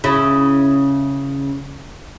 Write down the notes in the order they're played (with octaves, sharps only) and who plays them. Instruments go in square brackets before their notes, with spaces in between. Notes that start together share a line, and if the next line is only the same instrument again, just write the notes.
[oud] C#3 E4